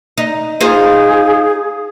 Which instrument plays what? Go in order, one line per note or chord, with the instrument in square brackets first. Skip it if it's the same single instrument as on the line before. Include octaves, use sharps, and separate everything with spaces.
[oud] D#4
[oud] D#4 F4 C5 [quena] G#4